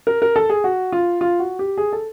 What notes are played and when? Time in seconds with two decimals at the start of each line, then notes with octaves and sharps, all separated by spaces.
0.07 A#4
0.22 A#4
0.36 A4
0.49 G#4
0.64 F#4
0.92 F4
1.21 F4
1.39 F#4
1.59 G4
1.77 G#4
1.93 A4